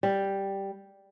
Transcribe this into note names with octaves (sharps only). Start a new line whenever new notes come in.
G3